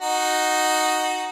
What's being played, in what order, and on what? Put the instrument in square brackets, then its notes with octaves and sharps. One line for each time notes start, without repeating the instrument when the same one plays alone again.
[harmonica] D#4 F#4